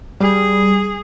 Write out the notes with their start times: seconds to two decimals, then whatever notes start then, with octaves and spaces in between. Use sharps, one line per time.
0.20 G3 G#4